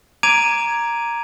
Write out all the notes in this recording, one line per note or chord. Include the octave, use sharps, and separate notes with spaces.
A#5 D6 G#6 D7 D#7 F7